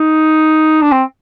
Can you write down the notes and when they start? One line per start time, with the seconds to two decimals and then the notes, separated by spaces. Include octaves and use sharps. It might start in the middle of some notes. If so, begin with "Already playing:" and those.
Already playing: D#4
0.82 D4
0.92 C4